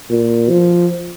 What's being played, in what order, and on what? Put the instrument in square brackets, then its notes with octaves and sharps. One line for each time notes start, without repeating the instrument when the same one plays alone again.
[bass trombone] A#2
F3